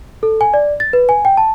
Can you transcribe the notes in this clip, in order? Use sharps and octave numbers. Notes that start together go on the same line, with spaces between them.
A4
G#5
D5
A6
B4
G#5
G5
A5